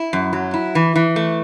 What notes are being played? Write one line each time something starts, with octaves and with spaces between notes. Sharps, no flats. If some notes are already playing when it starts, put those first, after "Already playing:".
Already playing: E4
F#2
F#3
E4
E3
E3
A3